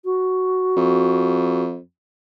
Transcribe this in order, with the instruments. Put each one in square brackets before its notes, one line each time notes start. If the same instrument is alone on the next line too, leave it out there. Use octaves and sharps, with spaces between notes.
[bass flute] F#4
[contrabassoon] F2